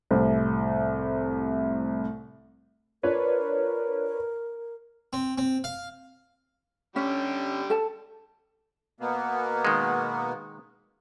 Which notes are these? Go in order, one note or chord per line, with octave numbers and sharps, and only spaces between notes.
C2 A2 C3
D4 F4 A#4 B4 C#5
C4
C4
F5
D3 G3 C#4 G4
A4 A5
B2 A#3 B3
D#3 G#3